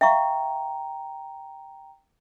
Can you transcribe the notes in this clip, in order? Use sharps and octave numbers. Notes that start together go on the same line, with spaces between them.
E5 F5 G5 A#5 C#6